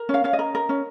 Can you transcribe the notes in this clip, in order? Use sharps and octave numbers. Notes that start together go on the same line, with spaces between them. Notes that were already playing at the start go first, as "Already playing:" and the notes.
Already playing: A#4
C#4
F5
C#4 F5
D#5
A#4
A#4
C#4